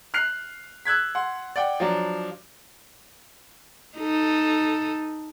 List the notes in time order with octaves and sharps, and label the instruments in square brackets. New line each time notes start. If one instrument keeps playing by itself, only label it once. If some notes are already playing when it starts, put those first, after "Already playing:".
[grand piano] F6 F#6 C7 F7
E6 F#6 G#6 B6
F#5 C6
D5 F#5 G5
F3 F#3 D4
[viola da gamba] D#4 A4